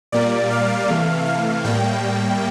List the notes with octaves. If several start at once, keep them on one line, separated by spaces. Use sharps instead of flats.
A#2 G3 A#3 D5
F5
C3 E3 A3
F5
A2 G3 A#3 G5